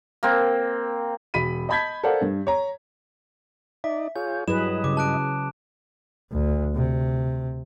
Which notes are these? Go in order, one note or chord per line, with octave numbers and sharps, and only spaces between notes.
A#3 C4
E1 B5 B6 D#7
D#5 A5 B5 G6 G#6 B6
A4 A#4 C5 D5 F5 F#5
G2
C#5 A#5
D#4 D5 E5
F4 G#4 C#5 G6
G2 F#3 E4 G#4 B4 D#5 E7
C#3 D6
A5 F#6 D7
D2
C3